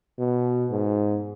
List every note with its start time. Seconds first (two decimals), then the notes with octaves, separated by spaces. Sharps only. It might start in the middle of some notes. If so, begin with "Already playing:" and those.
0.18 B2
0.71 G#2